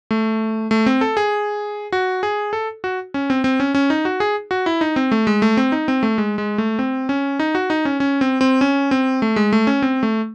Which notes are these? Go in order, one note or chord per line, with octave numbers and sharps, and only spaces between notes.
A3
A3
C4
A4
G#4
F#4
G#4
A4
F#4
C#4
C4
C4
C#4
C#4
D#4
F#4
G#4
F#4
E4
D#4
C4
A3
G#3
A3
C4
D#4
C4
A3
G#3
G#3
A3
C4
C#4
D#4
F#4
D#4
C#4
C#4
C4
C4
C#4
C4
A3
G#3
A3
C#4
C4
A3